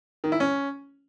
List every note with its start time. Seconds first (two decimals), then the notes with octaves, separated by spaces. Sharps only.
0.24 D#3
0.32 E4
0.40 C#4